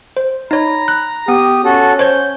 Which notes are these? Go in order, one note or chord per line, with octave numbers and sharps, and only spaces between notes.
C5
D#4 C#5 A#5 B5
F#6
B3 G4 D#6
C#4 F#4 A4
C5 C#5 G6 G#6